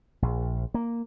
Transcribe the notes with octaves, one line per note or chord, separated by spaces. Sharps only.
A#1
A#3